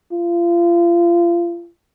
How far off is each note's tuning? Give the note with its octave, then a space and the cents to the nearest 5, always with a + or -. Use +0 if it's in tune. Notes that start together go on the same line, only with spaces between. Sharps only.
F4 -30